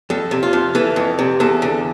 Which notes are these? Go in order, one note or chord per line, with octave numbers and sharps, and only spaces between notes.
F2 A4
C3
F4
F2
E3 A4
F2
C3
E2 A4
D3